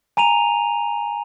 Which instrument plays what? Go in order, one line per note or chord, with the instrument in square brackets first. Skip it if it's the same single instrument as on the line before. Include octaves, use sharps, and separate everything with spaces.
[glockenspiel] G#5 A#5 D#7 F7